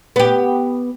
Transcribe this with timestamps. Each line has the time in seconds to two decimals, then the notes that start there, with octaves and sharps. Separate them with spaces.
0.16 B3 G4